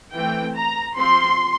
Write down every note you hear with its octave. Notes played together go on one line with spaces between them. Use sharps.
E3 A3 C4 G5
A#5
F3 C4 C6